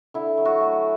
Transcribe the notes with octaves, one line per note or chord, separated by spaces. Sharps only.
D3 E4
F#3
F#4
A3